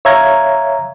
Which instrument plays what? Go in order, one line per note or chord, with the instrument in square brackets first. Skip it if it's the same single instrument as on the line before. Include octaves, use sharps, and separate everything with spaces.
[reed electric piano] C#5 E5 F5 A#5 G#6